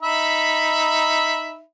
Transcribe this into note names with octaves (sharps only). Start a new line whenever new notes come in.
D#4 E5 B5